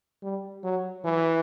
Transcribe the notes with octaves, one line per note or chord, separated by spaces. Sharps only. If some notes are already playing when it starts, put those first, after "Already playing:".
G3
F#3
E3